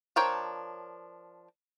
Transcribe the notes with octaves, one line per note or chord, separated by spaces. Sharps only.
F3 D4 A#4 C#5 G5